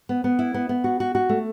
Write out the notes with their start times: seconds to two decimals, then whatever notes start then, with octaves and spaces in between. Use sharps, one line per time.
0.09 B3
0.24 B3
0.39 E4
0.54 B3
0.69 B3
0.84 F#4
1.00 F#4
1.15 F#4
1.29 A3